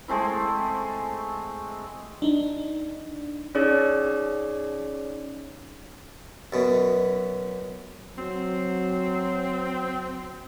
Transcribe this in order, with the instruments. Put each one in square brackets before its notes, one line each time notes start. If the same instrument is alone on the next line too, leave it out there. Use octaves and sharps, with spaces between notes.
[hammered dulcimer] G#3 A3 C4 E4
[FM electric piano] D4 D#4
[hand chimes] C#4 D#4 G#4 C#5 D5
[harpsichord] F#2 B2
[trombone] F#3 [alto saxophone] C4